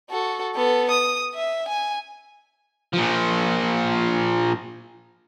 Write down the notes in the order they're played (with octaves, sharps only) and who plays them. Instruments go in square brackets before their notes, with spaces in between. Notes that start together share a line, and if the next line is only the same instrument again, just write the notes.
[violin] F#4 A4
B3 A4
D#6
E5
G#5
[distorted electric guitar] A#2 F3